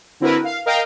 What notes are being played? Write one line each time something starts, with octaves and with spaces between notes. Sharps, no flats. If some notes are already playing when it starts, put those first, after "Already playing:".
D3 C4 E4 F#4 A#4 B4
F5
A#4 D#5 F5 G5 A#5